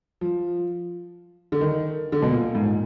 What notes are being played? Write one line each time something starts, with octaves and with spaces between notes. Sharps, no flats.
F3
D3
D#3
D3
B2
A#2
G#2
A#2